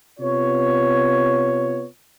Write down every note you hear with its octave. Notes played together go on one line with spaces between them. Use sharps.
C3 B3 F4 C#5